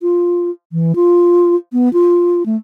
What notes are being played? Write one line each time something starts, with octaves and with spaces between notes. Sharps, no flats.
F4
E3
F4
B3
F4
A3